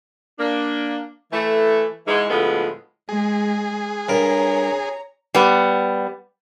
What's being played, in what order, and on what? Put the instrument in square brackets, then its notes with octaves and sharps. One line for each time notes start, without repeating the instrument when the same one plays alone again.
[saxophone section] A#3 D4
E3 A3
G#2 E3 G#3
D2 A2 F3 G#3 A3 B3
[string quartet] G#3 [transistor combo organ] G#4
[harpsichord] G2 A#4 [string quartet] C#5 A#5
[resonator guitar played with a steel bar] G3 B3